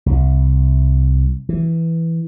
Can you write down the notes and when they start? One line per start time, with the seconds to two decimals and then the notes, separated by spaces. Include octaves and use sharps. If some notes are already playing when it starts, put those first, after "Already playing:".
0.06 C2
1.49 E3